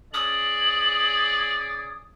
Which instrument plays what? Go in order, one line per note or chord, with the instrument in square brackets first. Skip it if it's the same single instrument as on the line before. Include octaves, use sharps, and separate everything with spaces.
[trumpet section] C#4 G#4 D5 [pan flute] D#6 [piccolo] F#7